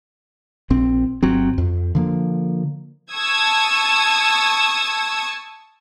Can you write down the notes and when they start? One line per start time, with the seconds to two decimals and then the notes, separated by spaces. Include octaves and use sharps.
0.70 A#1 C4
1.23 G1 F#3 C4
1.58 F2
1.95 D3 F3 A#3
3.12 A5 C#6 D#6 E6 G#6